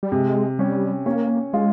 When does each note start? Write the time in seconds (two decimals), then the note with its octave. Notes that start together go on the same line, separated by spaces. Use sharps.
0.03 G3
0.12 C3 G#3
0.59 G3 C#4
1.06 A#3 C#4
1.53 G#3 F4